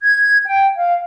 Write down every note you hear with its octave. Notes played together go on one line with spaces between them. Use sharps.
G#6
G5
F5